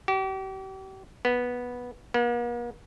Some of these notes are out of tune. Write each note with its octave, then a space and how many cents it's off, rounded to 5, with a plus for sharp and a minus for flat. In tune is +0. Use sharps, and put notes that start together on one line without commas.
G4 -40
B3 -10
A#3 +45